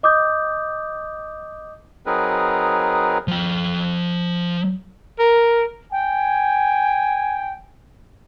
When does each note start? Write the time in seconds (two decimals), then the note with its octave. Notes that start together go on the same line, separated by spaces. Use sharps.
0.03 D#5 D6 D#6 G6
2.06 F#3 C4 D#4 G#4 A#4 B4
3.28 F3 G5
5.19 A#4
5.92 G5 G#5